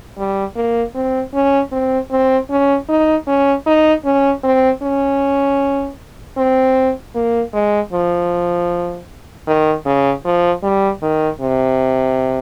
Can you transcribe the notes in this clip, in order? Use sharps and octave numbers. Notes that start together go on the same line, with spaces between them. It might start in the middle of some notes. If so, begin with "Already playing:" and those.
G3
A#3
C4
C#4
C4
C4
C#4
D#4
C#4
D#4
C#4
C4
C#4
C4
A#3
G#3
F3
D#3
C#3
F3
G3
D#3
C3